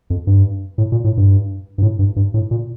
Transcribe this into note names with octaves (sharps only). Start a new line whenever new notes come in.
F2
G2
A2
A#2
A2
G2
G2
A2
G2
G2
A2
A#2